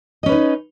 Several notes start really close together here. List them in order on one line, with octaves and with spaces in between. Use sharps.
D#5 C#4 B4 D#4